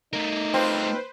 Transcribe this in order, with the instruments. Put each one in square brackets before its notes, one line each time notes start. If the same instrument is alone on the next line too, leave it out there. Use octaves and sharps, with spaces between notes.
[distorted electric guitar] A3 A#4 [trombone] D#4
[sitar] C4 F4 [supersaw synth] B4 C5